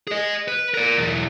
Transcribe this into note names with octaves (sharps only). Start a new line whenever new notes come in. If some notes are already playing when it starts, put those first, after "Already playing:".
G#4 D#5
B4
A#4 D5
B1 E2